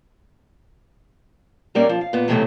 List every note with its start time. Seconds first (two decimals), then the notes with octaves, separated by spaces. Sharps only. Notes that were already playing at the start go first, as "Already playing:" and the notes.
1.75 A#2 G3 A#3 C#4 D5
1.89 F3
2.01 F5
2.13 A#2 B3
2.28 E2 A2 C3 D#3 F#3 A3